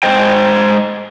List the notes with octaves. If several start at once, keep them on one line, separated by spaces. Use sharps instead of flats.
G#3 C5 D#5 G5